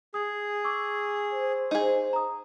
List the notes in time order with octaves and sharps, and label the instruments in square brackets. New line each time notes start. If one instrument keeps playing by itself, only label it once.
[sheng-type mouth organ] G#4 [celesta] D#6
[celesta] C#6 D6 E6
[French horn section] C5
[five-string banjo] D#4 G#4
[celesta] A#5 D#6